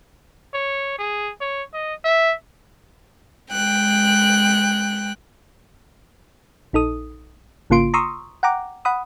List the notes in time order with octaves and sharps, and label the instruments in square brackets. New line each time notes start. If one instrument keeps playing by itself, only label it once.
[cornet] C#5
G#4
C#5
D#5
E5
[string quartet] G#3 G5 F#6
[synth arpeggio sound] A#1 D#4 A4 D#6
G#1 C#3 A#3 F4 C6 D7
A#5 C6 C#6 D#6 E6
F#5 G5 A#5 D6
F#5 B5 D#6